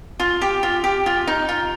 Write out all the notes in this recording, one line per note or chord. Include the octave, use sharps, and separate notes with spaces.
F4
G4
F4
G4
F4
D#4
F4